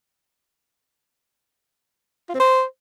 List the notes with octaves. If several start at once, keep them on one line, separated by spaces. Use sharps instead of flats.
F4
C4
C5